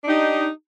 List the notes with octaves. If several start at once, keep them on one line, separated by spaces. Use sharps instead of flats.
D4 D#4 G4